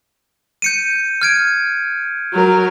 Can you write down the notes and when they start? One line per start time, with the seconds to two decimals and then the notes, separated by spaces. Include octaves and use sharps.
0.62 G6 C#7 D#7
1.21 F6 G#6 D7
2.33 F#3 A#4